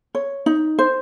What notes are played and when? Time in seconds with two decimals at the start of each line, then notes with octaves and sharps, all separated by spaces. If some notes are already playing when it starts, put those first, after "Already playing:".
0.15 C#5
0.46 D#4
0.79 C5